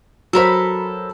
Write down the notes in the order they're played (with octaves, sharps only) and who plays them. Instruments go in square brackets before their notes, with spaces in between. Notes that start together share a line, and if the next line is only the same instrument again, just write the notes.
[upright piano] F#3 C5 [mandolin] A4 A#4 B5